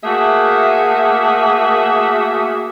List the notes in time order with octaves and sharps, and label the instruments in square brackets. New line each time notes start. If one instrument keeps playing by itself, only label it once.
[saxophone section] A3 A#3 F#4 G#4 E5